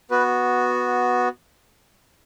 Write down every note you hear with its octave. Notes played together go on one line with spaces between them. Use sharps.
B3 F#4 B4